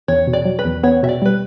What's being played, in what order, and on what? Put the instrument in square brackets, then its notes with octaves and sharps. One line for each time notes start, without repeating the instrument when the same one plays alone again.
[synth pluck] E2 [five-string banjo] C#5
[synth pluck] B2
[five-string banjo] D5
[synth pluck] F#3
[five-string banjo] B4
[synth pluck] E2
[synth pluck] B3 [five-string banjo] C#5
[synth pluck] B2 [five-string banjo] E5
[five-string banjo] D5
[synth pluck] G3 [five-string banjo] B4